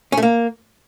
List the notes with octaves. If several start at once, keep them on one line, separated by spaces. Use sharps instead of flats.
C#4
A3
A#3